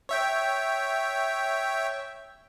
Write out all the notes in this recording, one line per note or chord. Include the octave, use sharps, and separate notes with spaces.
C#5 E5 G5